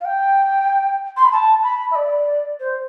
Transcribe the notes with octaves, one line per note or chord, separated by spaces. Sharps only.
F5
G5
C6
B5
A5
B5
E5
D5
C5